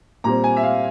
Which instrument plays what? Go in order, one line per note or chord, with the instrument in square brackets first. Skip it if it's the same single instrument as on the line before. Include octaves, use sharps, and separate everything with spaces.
[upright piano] A#2 G3 C4 A#5
G#5
E5
F5